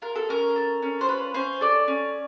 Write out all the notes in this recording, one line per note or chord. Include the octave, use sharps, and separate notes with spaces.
F4 A#4
A4
C#4 A#4
A4
C#4
C5
F4 B4
C#4 C5
A4 D5
C#4